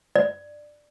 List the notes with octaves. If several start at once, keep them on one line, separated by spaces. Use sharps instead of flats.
D5